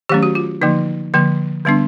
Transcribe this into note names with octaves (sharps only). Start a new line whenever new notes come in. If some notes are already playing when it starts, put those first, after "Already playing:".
D#3 F#3 A3 C#4 G4
F#4
F4
D3 F3 A#3 D#4
D3 F3 A#3
D3 G3 B3 D4